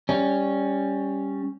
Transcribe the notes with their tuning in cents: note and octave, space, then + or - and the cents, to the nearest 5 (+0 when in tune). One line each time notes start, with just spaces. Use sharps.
G3 +10 C#4 +0